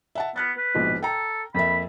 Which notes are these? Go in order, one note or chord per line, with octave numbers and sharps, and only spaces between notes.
E5 F#5 A5
B3 F6 F#6 A6
B4
A#1 G#2 B2
A4 G5 A#5
F2 A#3 E5 B5